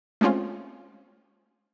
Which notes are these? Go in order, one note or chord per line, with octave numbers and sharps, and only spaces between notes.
G#3 A3 C4 C#4 F4